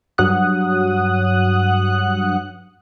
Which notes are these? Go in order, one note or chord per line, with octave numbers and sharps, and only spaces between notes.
G2 F#3 F#5 D#6 F#6